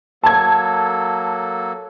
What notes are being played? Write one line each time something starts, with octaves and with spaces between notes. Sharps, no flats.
F#3 A#3 A4 A5 G#6